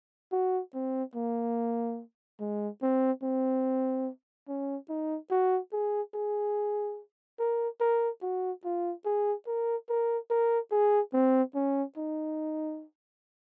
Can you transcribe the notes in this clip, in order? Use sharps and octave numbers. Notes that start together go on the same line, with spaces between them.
F#4
C4
A#3
G#3
C4
C4
C#4
D#4
F#4
G#4
G#4
A#4
A#4
F#4
F4
G#4
A#4
A#4
A#4
G#4
C4
C#4
D#4